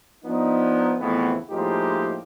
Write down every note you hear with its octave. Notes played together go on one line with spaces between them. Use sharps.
F3 B3 D4 D#4
F2 A2 C#3 E3 B3
A2 F3 G#3 A#3 D#4 G4